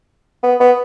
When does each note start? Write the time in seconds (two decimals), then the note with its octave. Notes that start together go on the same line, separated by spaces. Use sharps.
0.43 B3
0.60 B3